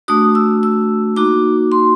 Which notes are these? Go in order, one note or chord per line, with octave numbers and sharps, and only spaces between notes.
A3 D4 F#4 D#6
E6
E6
A#3 D#4 F#4 D6
C6